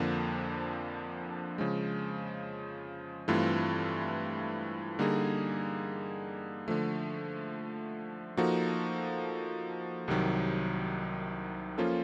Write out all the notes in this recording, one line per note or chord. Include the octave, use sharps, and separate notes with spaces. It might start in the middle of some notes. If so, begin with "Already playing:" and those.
Already playing: F2 D3 F3 A#3 D4
C#3 F3 G#3
G2 E3 A3 C4 F4
D3 G3 A#3 D#4 G#4
D3 F3 A3
F3 A#3 D#4 F#4 A4
C2 C3 D#3 F#3
F3 A#3 C#4 F4 A4